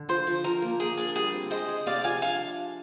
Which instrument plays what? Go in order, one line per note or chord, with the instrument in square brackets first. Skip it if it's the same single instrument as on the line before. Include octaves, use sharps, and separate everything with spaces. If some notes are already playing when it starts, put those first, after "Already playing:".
Already playing: [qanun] D3
[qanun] F3 [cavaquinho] C5
[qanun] F3
[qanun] F3 [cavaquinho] A#4
[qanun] A#3
[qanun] A#3 [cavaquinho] G#4
[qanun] D4 [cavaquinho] G#4
[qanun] G3 [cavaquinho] G#4
[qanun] C4
[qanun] G#3 [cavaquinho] C5 D#5
[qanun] G#3
[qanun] C3 [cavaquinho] D5 F5
[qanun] F3 [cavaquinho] F5 G#5
[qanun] D4 [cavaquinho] F5 G#5